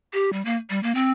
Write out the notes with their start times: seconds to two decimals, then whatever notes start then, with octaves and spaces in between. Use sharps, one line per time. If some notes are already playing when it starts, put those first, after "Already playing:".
0.13 G4
0.33 G3
0.45 A#3
0.70 G3
0.83 A#3
0.95 C4